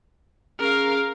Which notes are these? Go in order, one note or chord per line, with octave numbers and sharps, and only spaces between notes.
C#4 G#4 A#4 F5